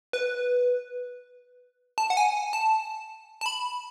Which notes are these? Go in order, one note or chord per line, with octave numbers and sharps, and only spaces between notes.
B4
A5
F#5
G#5
A5
A5
B5